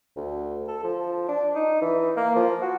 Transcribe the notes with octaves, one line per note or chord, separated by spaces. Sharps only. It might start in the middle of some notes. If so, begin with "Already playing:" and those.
D2
A4
F3
D4
D#4
E3
A#3
F3
F#4